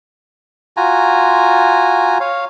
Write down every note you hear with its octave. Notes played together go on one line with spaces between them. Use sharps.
F4 F#4 G#5 A#5
C#5 F5